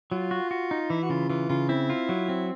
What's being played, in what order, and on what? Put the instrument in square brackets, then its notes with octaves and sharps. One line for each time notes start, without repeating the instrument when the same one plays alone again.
[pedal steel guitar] F#3 [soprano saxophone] F4
[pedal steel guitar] F#4
F#4
D#4
[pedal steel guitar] E3 [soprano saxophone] E4
[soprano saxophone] F#4
[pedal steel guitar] C#3 [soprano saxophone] F4
[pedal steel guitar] E3 [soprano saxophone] F4
[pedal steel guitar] C#3 [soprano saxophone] F4
[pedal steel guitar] C4 [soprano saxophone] E4
[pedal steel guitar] F4
F#3
C4